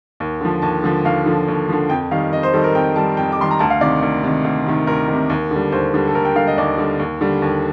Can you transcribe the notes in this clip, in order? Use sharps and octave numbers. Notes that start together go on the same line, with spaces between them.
D#2
D3 F3
D#2 A5
D3 F3
D#2 F5
D3 F3
D#2
D3 F3
F2 G5
D#3 G3 F5
F2 D#5
C5
D#3 G3 A4
A#4
F2 G5
D#3 G3 A5
F2 G5
D6
D#3 G3 C6
A#5
D2 A5
F5
C3 D#3 D5
D2
C3 D#3
D2
C3 D#3
D2 A#4
D#3
C3
D#2
D3 G3
D#2 C5
D3 G3
A4
D#2 A#4
G5
D3 G3 F5
D#5
D#2 D5
D3 G3
D#2
D3 G3
D#2